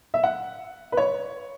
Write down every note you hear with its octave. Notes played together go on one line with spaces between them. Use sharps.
E5
F#5
B4
C#5